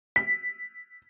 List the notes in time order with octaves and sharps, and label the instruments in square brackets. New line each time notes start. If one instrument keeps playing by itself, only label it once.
[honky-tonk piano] B6